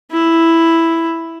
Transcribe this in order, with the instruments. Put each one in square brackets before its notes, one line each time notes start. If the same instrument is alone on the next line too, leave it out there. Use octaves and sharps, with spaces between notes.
[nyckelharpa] E4